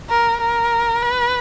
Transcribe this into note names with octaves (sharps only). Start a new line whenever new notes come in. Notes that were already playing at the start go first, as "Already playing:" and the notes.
A#4
A#4
B4